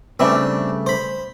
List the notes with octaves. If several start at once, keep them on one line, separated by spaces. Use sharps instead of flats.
C#3 G3 A3 C4 D4 B4 E5
C5 B5